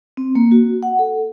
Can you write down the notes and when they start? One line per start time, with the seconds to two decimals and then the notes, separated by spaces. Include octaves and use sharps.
0.17 C4
0.35 A#3
0.52 F#4
0.83 F#5
0.99 A4